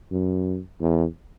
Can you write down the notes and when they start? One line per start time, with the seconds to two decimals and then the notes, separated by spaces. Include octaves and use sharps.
0.12 F#2
0.81 E2